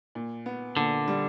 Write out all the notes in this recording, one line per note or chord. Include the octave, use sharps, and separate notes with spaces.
A#2
B3
A#2 D3
G3